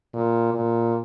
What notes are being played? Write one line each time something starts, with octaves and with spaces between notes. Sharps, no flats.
A#2
A#2